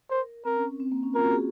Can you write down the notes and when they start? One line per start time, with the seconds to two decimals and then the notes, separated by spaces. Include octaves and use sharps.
0.10 A#4 C5
0.45 C4 A#4
0.57 C#4
0.80 C4
0.92 A#3
1.03 C#4
1.15 F4 A#4
1.23 F#4
1.32 G#4